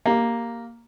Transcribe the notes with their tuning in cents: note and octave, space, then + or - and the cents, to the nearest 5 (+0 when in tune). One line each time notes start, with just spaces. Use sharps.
A#3 +0 G4 +5